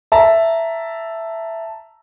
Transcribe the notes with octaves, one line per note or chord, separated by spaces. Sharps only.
E5 A5 A#5